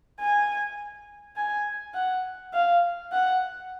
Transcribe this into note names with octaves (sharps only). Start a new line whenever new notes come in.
G#5
G#5
F#5
F5
F#5